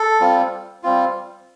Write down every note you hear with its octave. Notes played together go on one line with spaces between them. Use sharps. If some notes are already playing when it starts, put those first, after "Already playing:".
Already playing: A4
G3 C4 F4
G3 C4 F4